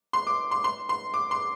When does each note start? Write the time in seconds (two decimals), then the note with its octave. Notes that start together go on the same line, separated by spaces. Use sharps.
0.13 C6
0.27 D6
0.51 C6
0.64 C6
0.89 C6
1.14 D6
1.31 C6